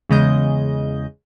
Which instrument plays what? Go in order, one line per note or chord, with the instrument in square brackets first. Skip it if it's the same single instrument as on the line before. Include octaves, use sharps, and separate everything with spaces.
[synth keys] E2 C#3 G#3 D#5 G6